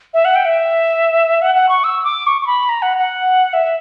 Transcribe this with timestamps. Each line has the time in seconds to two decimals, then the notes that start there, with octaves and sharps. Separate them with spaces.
0.14 E5
0.25 F#5
0.36 G5
0.45 E5
1.42 F#5
1.55 F#5
1.69 C#6
1.84 E6
2.04 D6
2.27 C#6
2.41 C#6
2.47 B5
2.69 A#5
2.82 F#5
2.97 F#5
3.53 E5